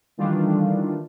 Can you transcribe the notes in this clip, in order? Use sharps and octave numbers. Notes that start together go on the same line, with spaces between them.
D#3 E3 G3 A3 D4 F4